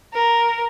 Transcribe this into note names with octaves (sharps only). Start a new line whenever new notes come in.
A#4